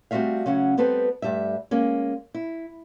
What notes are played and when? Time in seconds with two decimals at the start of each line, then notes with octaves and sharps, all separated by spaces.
0.11 G3 A3 C4 F#4 E5 F5
0.46 C#3 F#3 C#4 F#5
0.77 G3 B3 C4 A4 B4 C5
1.22 G2 G3 A3 E5
1.71 G#3 A#3 C#4
2.34 E4